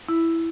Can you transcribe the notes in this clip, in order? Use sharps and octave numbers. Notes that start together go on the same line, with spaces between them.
E4